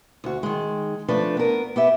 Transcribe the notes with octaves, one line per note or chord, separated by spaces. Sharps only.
D2 F#4
D#3 G#3
F3 A3 D4 B4
B3 A#4
B3 G4 E5